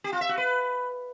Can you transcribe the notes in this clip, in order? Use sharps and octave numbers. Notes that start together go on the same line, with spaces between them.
G4
F4
E5
F#4
B4